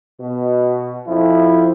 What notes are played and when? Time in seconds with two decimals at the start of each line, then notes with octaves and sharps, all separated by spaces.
0.20 B2
1.07 F2 F3 E4